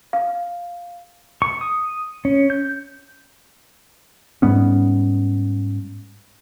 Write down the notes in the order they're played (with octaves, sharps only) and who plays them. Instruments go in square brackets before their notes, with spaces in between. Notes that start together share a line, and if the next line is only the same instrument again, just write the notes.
[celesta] F5
[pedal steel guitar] C#6
D#6
C#4
G6
[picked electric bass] G#2 G3 B3 C#4